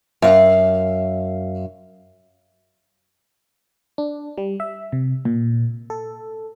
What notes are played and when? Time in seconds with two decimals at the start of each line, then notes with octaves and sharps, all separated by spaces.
0.22 F#2 F5
3.98 D4
4.38 G3
4.60 E5
4.92 C3
5.25 A#2
5.90 A4